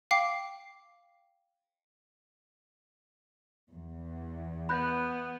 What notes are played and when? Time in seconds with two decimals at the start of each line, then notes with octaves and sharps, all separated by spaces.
0.11 F5 G5 D6 C7
3.73 E2
4.69 B3 B5 F#6 G6